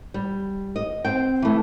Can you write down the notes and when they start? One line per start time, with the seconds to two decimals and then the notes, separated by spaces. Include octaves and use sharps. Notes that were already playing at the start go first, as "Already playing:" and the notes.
0.14 G3
0.76 D#5
1.05 C4 G5
1.42 E3 A3